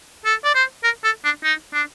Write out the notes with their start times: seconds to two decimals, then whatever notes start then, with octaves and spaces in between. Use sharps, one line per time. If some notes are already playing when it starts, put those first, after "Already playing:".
0.25 A4
0.44 D5
0.54 C5
0.83 A#4
1.04 A4
1.24 D4
1.43 D#4
1.73 D4